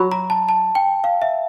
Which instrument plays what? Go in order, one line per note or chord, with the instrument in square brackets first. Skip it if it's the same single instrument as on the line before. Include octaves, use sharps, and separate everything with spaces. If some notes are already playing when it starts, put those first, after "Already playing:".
Already playing: [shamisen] F#3 [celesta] B5
[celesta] A#5
A5
A5
G5
F5
E5